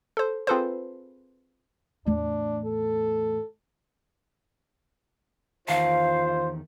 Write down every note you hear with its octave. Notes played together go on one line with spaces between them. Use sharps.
A4 C5
C4 F4 G#4 A4 B4 C5
E2 A2 D4
A4
E2 D#3 F4 C5 F5 A5